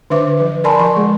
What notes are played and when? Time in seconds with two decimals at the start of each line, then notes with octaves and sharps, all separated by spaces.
0.10 D3 D4 B4 E5 D6
0.37 F3 B4
0.64 A#4 D5 G#5 A5 B5 C6
0.79 F3 C6 C#6
0.96 G#3 G#4